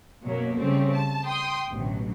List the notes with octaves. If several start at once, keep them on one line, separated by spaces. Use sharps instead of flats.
F#2 B2 F#3 A#3
C#3 G3 A3 C4 C#4
A5
G5 C6 D#6
A1 D2 B2 F#3